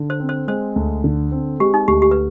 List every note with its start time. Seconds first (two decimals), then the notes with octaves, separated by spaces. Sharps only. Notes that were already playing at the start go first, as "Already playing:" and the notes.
Already playing: D3
0.10 C5
0.20 C4
0.29 C5
0.48 G#3 C5
0.76 D2
1.04 D3
1.32 C4
1.60 G#3 G4
1.74 D#4
1.88 D2 G4
2.02 G4
2.11 B4